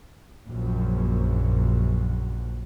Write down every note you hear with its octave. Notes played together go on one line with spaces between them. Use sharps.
A#1 F#2